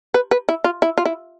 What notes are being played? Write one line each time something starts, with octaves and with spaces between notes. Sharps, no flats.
B4
B4
E4
F4
E4
F4
E4